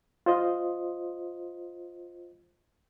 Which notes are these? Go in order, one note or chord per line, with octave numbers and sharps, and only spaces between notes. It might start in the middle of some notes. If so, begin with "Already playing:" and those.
F4 C5 D#5